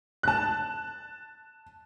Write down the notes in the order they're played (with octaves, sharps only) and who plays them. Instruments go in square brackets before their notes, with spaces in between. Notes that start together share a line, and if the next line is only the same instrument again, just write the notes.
[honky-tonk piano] A5 F#6